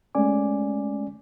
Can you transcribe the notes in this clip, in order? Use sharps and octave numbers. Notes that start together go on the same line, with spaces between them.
G#3 A3 C#4 D5 G#5 D6